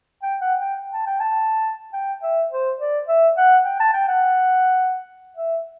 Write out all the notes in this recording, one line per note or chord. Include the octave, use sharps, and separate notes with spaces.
G5
F#5
G5
A5
G5
A5
G5
E5
C5
D5
E5
F#5
G5
A5
G5
F#5
E5